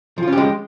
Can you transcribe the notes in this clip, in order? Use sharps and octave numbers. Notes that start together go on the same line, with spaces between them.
F3 G#3 C#4 F4 G4